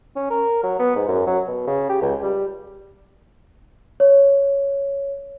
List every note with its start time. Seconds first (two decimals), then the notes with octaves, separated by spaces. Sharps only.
0.16 C#4
0.30 A#4
0.63 F#3
0.79 B3
0.95 G#2
1.08 F#2
1.27 F#3
1.47 B2
1.67 C#3
1.89 G4
2.02 C#2
2.22 G3
4.00 C#5